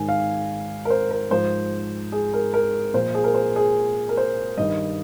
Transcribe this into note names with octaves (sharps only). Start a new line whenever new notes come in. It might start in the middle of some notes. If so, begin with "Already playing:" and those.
Already playing: G#2 D#3 G#5
F5
A#4
C5
A#4
G#2 F3 C5
G#4
A#4
A#4
A#2 F3 C5
G#4
A#4
C5
G#4
A#4
C5
G2 D#3 D#5